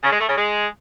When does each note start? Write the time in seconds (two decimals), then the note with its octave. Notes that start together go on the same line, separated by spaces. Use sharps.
0.03 C#3
0.12 G#3
0.20 A3
0.29 C#3
0.37 G#3